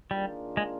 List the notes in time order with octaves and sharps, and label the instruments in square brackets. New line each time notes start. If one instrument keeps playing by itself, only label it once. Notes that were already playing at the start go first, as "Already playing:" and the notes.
[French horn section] D#3 A#3 D4 F4 G#4 [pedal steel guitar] G3
[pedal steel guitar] G#3